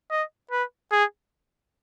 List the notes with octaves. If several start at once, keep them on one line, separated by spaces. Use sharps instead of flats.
D#5
B4
G#4